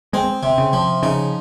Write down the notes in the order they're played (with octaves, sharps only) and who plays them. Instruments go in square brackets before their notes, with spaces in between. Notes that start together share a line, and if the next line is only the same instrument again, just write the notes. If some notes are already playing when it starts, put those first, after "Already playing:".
[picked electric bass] G#3 [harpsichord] C4
[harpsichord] C3
[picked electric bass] C#3
[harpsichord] F3
[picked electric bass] C#3 [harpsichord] D#4